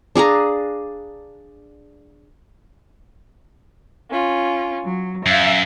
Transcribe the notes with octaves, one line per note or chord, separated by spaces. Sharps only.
D4 G#4 F5 A#5
C#4 F4
F#3
F#2 E5 F5